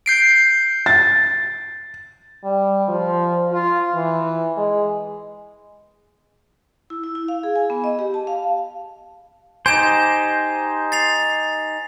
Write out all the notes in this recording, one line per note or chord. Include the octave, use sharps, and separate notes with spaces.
G6 C7 D7
A6
G3
F3
F4
E3
G#3
E4
E4
E4
F5
G#4
G#5
B3
D#5
G4
A5
F5
D#4 G4 C5 G#5 G#6 E7
A6 C7 F7